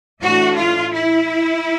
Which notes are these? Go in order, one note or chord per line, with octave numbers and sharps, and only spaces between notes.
A2 E3 A3 D4 F#4
F4
E4